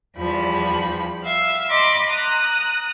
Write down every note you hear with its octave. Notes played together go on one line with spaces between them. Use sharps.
E2 F3 G3 B5
E5 F5
D#5 B5 C6 D6
A#5 D#6 F#6